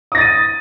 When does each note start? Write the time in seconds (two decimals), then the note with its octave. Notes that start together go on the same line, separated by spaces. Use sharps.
0.12 D#6
0.15 A#6
0.18 A6
0.21 D#7